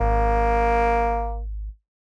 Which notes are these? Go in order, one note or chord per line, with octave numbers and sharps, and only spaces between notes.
G#1 A#3